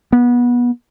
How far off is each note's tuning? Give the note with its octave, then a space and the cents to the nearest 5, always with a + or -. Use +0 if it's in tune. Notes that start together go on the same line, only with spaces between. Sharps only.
B3 -25